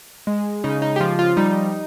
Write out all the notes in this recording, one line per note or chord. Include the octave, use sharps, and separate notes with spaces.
G#3
C#3 D#4
D#4
G4
F3 F4
F4
G3 D#4